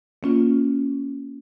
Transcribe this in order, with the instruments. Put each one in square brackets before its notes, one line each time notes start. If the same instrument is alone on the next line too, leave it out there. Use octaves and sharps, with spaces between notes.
[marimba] A#3 C#4 F4